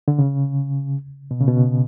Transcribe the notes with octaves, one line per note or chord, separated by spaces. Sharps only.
D3
C#3
B2
C#3
B2